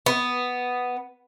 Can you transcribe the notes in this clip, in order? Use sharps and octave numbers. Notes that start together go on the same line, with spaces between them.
B3